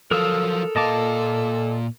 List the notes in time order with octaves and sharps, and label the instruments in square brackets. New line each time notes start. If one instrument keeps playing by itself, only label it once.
[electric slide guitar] F3 F#3 F4 [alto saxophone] A4 [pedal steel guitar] A#4 D#6 E6
[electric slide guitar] A#2 F5 [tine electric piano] D#5 A5 D6